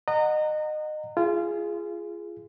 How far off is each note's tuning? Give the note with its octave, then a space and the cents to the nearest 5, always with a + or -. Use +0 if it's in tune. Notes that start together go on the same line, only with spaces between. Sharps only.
D#5 -25 F#5 +0 A#5 -25
F4 -25 G#4 +0